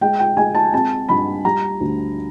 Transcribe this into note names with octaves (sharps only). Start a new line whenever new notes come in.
G#3 G5
G5
G#3 G#5
A5
C4 A5
G2 B5
G3 A#5
D2